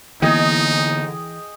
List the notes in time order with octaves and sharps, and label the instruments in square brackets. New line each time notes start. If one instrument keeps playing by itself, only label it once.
[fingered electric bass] D3 A#3 B3 [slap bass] E3 [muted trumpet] D#4 [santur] G#4 D#5 G5